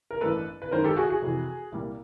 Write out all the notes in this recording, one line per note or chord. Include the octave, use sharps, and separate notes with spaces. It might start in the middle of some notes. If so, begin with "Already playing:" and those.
A#4
A1 G2 E3 A4 B4
B4
F#2 D#3 G#3 A#4 C5
G4 A4
F#4 G#4
F#4 G#4
F2 C3 E3
C2 A#2 G3 A#3